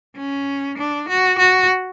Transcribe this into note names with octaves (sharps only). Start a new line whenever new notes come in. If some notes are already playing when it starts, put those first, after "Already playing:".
C#4
D4
F#4
F#4